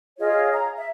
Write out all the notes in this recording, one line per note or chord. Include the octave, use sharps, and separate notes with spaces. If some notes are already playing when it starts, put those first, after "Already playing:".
F4 G#4 C#5 D#5
A#5
E5